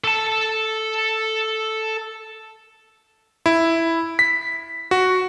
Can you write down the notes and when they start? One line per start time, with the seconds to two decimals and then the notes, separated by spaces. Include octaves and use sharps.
0.04 A4 A5
3.46 E4
4.19 B6
4.91 F#4